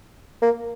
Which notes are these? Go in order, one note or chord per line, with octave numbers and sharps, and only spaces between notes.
A#3